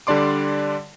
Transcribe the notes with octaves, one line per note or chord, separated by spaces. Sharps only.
D3 G3 D4 D5 C6 D6